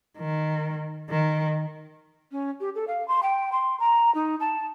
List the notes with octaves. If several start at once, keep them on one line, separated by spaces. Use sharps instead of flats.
D#3
D#3
C#4
G4
A4
F5
C6
G5
C6
A#5
D#4
A5